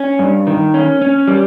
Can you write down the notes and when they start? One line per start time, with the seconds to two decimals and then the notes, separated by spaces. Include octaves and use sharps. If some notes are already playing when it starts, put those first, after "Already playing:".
Already playing: C#4
0.19 G2
0.47 D#3
0.74 C#4
1.01 C#4
1.28 G3